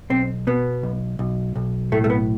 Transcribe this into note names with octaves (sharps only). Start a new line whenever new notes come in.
B1 C4
B2 B3
B1
B1
B1
A2 A3
A3
B3